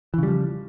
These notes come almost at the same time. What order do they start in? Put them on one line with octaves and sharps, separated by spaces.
E3 C#3 G3 F3